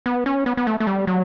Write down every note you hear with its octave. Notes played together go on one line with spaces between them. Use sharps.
B3
C#4
B3
B3
A3
A3
G3
F#3